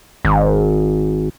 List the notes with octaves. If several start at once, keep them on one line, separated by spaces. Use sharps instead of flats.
G#1